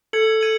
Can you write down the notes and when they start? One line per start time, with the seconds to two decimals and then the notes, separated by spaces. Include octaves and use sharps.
0.13 A4 G#6 C#7 F#7
0.41 G#6 D#7 F#7